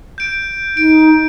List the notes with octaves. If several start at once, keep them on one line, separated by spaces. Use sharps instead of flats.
G6 D7
D#4 D7